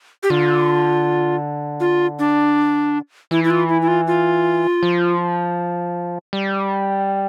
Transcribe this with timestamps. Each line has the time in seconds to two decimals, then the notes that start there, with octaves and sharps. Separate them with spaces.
0.23 G4
0.30 D3 F4
1.80 F4
2.19 D4
3.31 E3 E4
3.44 E4
3.50 F4
3.69 E4
3.82 E4
3.88 F4
4.07 F4
4.83 F3
6.33 G3